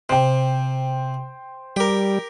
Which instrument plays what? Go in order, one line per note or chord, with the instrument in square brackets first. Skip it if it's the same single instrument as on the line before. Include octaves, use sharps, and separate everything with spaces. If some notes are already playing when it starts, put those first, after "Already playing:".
[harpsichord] C3 [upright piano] C5 G5
[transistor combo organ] G3 [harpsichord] G4 A#4